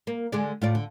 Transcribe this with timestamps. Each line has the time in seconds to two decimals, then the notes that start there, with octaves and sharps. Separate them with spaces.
0.07 A#3
0.32 D3 G#3 D5
0.62 A2 F4 D5
0.75 D3